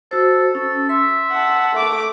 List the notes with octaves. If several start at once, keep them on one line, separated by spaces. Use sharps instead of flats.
F#4 A4 C5
C#4 A4
E5 C6
F#5 A5
A3 D6